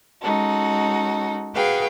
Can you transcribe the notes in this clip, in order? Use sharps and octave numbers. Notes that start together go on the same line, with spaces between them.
G#3 C#4 D#4 F#4 A4
F#4 G#4 B4 F5 G5